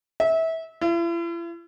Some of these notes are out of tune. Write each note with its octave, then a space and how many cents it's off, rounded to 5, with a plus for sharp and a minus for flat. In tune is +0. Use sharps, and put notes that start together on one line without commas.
E5 -25
E4 +45